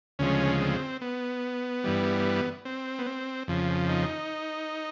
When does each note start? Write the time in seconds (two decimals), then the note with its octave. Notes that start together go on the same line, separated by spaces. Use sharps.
0.19 D2 C#3 F3 G#3 C#4
0.60 C4
1.01 B3
1.84 G2 E3 G3
2.65 C4
2.99 B3
3.06 C4
3.48 F2 C#3 F3
3.89 D#4